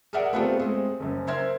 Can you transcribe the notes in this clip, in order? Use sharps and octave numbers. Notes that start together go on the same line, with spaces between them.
G#4 A#4 D5 E5 F#5
A3 B3 C4 F4 G4 A4
G#3 C4 G#4
F#1 F#2
A#4 C5 E5 C6 G#6